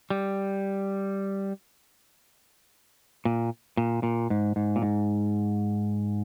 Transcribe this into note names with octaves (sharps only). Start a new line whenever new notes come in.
G3
A#2
A#2
A#2
G#2
G#2
A#2
G#2